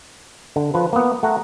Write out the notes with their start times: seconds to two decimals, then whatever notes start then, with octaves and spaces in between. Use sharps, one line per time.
0.56 D3
0.74 F3 B4
0.93 A#3 B3
1.23 A3 F#5 A#5